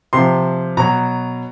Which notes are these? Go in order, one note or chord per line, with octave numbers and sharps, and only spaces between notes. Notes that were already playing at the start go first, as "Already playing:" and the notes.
C3 F3 C6
B2 F#3 A#5